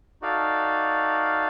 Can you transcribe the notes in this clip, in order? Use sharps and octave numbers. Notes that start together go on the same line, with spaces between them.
D#4 F#4 A4 D5 F5